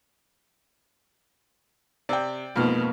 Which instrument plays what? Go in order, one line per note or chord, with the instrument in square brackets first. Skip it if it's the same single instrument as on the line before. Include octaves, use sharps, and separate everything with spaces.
[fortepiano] C3 [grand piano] D5 G5
[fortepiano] F2 G#2 F6 [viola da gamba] B2 [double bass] A#3